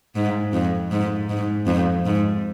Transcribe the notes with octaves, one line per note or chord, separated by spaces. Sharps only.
G#2
F2
G#2
G#2
F2
G#2